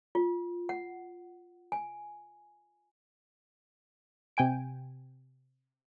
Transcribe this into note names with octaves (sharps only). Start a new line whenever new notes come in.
F4
F#5
G#5
C3 G5 G#5 D7